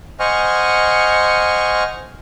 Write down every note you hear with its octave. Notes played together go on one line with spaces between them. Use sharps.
C5 D#5 F#5 G#5 C#6 F6